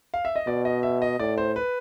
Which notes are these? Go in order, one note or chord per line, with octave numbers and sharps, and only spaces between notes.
F5
E5
D#5
B2 D5
D#5
E5
D#5
A2 D5
C5
B4